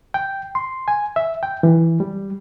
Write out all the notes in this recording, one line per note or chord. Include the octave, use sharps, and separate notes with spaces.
G5
C6
G#5
E5
G5
E3
G3